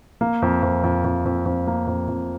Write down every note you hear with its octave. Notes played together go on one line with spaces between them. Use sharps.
A#3
F2
F2
F2
F2
F2
F2
A#3
F2
F2